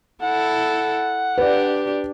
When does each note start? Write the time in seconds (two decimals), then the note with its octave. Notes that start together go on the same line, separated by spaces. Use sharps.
0.22 E4 A4 F#5
1.38 D4 G4 B4 D5